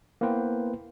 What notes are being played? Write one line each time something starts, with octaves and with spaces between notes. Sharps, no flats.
A#3 B3 E4 B4 C5 G5